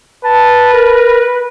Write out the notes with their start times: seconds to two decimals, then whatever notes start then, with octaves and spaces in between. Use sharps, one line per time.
0.24 B4 A5
0.73 A#4